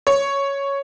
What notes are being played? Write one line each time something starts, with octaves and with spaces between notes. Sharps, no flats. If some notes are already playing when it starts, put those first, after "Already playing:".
C#5